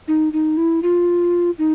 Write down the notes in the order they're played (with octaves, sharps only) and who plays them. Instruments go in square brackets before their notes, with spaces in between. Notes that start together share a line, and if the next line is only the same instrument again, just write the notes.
[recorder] D#4
D#4
E4
F4
D#4